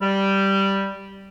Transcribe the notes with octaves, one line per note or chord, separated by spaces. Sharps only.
G3